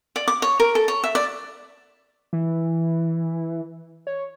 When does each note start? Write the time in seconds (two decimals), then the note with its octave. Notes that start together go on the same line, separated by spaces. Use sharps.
0.16 D5
0.28 D6
0.42 C#5
0.60 A#4
0.75 A4
0.88 C#5
1.04 E5
1.15 D5
2.33 E3
4.07 C#5